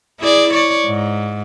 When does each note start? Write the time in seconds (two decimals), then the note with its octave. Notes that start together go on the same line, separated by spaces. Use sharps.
0.20 E4 G#4 D5
0.54 C#5 D5
0.86 G#2